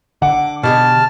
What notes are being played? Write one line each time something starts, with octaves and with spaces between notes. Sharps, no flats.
D3 F#5 D6
B2 G4 G#4 A5 F6